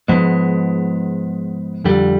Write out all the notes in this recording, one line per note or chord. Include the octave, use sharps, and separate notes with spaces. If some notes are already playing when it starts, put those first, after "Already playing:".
G#2 F3 G#3 B3
F2 D3 G3